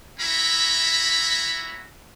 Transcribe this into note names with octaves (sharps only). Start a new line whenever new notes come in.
C#4 E4 F#4 E5 A#5 B5